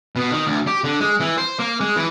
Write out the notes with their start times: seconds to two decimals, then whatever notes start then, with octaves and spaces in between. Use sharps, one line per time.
0.16 B2
0.31 D#3
0.47 D2
0.67 G4
0.84 D3
1.00 G#3
1.20 E3
1.38 C5
1.59 A#3
1.81 G#3
1.96 E3